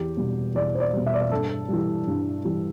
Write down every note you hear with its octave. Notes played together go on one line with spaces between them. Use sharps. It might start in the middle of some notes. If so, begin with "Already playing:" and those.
Already playing: E2 G4
B2 G3
E2 D5
C5
D5
B2 G3
E5
D5
E5
G2 A4
E3 G3
G2
E3 G3